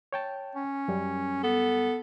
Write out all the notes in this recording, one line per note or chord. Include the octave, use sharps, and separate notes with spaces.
C#5 G5 A5
C#4
F#2 G3
B3 A4